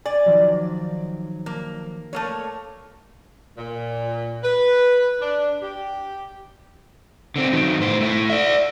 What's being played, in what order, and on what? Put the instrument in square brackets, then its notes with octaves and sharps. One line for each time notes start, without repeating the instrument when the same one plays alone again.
[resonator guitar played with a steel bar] D5 [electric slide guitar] G#5
[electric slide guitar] D#3 F3 F#3
[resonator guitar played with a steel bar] A#3
A3 A#3 C#5
[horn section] A#2
B4
D4
G4
[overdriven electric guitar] D3 C4
D#3 F#3
A2 C5
A3 E4
D5 E5